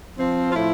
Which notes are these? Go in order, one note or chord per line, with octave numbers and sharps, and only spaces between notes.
F3 C4
F4
A2 E4